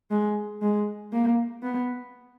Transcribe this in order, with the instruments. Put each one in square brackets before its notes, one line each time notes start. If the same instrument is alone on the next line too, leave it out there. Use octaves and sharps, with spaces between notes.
[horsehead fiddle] G#3
G#3
A#3
B3